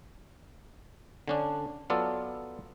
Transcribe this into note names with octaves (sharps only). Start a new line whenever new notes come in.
D3 C#4 D4
F#3 B3 F4 A4 D5